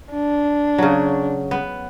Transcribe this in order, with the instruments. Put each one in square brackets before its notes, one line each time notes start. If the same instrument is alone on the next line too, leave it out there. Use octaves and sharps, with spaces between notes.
[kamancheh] D4
[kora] C#3 F#3
B3